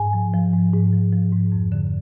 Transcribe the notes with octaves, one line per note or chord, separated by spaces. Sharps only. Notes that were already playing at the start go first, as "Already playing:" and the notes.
Already playing: G#2 G#5
F3
F3
G#2
G#2
F3
F3
G#2
F2
D3